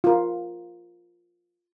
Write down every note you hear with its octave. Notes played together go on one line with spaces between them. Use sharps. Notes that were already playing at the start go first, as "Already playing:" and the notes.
F4 A#4